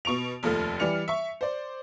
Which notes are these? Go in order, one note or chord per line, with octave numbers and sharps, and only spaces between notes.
B2 C#6 D7 F7
F1 D#2 F3 A3 A4 F6
E3 G3 D5 F6 C#7 F7
E5 C#6
C5 D5